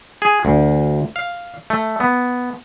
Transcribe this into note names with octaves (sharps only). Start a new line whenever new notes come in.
G#4
D2
F5
A3
B3